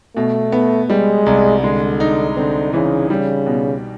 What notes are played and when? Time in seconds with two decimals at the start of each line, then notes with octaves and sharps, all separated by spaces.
0.16 B2 A3
0.52 B3
0.89 G3 G#3
1.26 C2
1.63 D3 G#3
2.00 D#4
2.36 D3 C4
2.73 C#3 E3
3.10 C#3 G3
3.47 B2